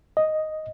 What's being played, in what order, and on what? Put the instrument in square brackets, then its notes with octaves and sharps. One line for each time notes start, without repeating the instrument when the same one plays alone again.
[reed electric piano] D#5